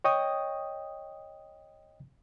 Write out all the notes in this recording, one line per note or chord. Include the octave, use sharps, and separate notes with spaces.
C#5 D#5 G5 C#6 D#6